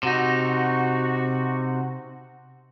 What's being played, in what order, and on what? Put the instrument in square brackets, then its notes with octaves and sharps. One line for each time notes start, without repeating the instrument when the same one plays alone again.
[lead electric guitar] C3 D#4 [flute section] F#4